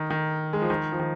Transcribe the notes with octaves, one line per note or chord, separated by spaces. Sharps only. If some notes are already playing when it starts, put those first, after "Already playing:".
Already playing: D#3
D#3
G#3
F3
D#3
F3
D#3